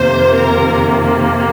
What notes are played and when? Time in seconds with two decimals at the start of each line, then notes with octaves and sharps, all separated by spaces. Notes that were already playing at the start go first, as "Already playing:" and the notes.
Already playing: F2 C3 D#3 A#3 C5
0.34 A#4